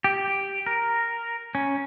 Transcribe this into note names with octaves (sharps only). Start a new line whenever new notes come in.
G4
A#4
C#4